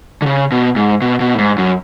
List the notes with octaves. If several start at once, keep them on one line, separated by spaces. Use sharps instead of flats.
D3
C#3
B2
G#2
B2
B2
A2
G#2
F#2